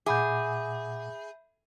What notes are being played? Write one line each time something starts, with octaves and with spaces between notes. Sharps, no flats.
A#2 G#4 E5 F#5 B5 D6 G6